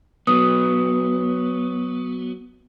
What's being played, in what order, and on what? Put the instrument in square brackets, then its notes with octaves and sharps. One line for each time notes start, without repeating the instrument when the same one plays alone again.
[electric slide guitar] F#3 B3 [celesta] D#6